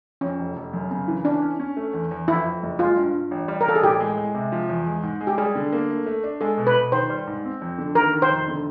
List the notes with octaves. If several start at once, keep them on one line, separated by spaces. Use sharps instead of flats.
F2 C#4
F1
F1
F#2
C#3
E3
C#4 D4
C#4
C#4
A3
E2
E2
F2 E4
F2
F#1
G#3 F4
G2
G2
A1
G3
A#4
A1 A4
G#4
A2 G4
G#3
G#3
C3
F3
E2
G#3
G#2
G#3
G4
G3 G#4
D3
A#3
A3
A3
D4
G#3 A4
B2
B4
B2
D#3 C5
G3
G#2
C4
F2
D3
D#3 A#4
D#3
C5
F1
D3